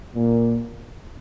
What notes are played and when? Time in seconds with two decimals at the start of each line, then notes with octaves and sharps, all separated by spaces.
0.15 A#2